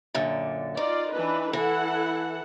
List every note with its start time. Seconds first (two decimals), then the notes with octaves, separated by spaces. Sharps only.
0.14 F#2 A#2 D3
0.77 D#4 F4 D5
1.13 E3 D4 B4
1.53 E3 E4 A4 F#5